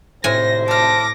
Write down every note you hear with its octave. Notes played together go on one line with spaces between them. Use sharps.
G#1 A2 C3 C5 G#5 A#6
A4 D6 F6 A#6